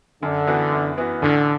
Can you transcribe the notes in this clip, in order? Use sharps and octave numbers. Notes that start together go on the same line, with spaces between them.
F#2 D3
E3 B3 F#4
F#2
E3 B3 F#4
A1 D3